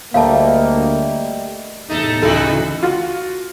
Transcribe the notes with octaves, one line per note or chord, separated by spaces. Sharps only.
D2 G3 A3 A#3 D#5 F5 A5
E2 A2 C3 A3 D#4 A4
D2 C#3 E3 G3 E4 F#4 A4
F4 F#4